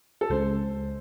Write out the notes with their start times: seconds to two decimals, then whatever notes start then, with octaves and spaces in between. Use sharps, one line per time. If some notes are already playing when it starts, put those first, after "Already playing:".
0.21 A4
0.30 C#2 C#3 G#3 C#4 C5